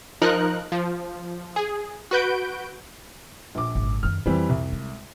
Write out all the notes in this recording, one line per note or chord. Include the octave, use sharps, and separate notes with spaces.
F3 D#4 A#4 F#6
F3
G#4
F#4 B4 G6 D7
A#1 D6
G#1 C#3
F#2 D#3 F6
F2 E3 G3 C4
C2
G#3